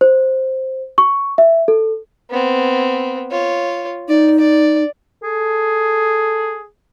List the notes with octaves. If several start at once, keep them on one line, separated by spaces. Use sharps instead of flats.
C5
C#6
E5
A4
B3 C4
F4 C#5
D#4 D5
D5
G#4 A4